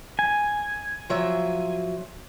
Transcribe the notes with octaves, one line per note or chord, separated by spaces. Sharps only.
G#5
F3 F#3 E5